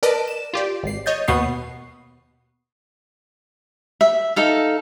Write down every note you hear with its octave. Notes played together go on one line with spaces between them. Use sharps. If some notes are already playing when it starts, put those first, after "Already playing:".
A#4 B4 D5 D#5 A5
E7
F4 G4 D5
G#1 C7
C#5 D#5 G6 A6
D#2 B2 B3 C#6 D#6 C7
E5
D#4 A4 F5